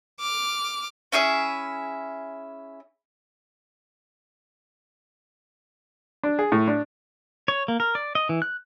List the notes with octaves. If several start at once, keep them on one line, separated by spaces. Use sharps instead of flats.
D6 F6
C#4 E4 G#4 E5
D4
G#4
A2
D4
C#5
A#3
A#4
D5
D#5
E3
F#6